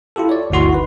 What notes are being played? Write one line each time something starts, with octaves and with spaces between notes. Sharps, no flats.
E4 F4 G4 A4
C#5 D5
G1 D2 E4 F#4 C6
D#3 D#4 B4